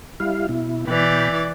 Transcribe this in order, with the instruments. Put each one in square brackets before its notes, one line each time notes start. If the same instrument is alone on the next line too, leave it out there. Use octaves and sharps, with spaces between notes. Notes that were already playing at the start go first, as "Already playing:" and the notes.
[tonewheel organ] G3 E4 F5
B2 E4
[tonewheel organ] B2 G5 B5 [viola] E3 D5